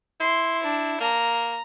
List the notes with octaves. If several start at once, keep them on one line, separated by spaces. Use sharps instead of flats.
E4 C6
D4
A#3 A#5